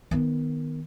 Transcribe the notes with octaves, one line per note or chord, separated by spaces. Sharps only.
D#3 B3